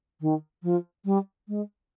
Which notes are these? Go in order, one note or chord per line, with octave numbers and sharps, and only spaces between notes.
D#3
F3
G3
G#3